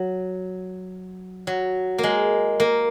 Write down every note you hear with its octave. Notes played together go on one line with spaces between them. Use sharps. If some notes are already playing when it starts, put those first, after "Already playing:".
Already playing: F#3
F#3
A#3
G#3
A#3